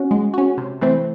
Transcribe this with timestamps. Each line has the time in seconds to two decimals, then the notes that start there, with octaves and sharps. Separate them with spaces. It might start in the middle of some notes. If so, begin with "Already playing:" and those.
Already playing: C#4 F#4
0.11 G#3
0.34 C#4 F#4
0.57 C3
0.81 E3 A3 C4